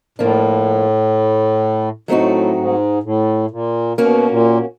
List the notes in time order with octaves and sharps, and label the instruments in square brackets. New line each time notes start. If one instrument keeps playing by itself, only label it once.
[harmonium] A2 [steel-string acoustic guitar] F3 A#3 D4
[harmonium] A2 [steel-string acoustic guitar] F#3 A3 C4 D#4 F#4
[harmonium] G#2
A2
A#2
[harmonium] B2 [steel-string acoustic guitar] A#3 C#4 F#4
[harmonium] A#2